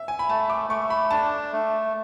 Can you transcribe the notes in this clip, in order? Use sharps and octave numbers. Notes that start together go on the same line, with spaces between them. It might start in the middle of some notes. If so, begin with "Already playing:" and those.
Already playing: E5
G#5
B5
A3 A5
D6
A3 C#6
B5
D4 A5
A3